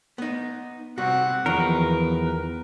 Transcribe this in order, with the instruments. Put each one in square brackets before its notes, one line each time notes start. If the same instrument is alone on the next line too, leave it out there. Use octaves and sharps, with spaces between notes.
[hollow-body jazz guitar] B3 D#4
[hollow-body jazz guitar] C3 G3 F#4 [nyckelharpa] C4 F#5
[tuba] E2 [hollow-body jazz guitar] D#3 F3 F#3 [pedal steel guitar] A#4 [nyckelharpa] B4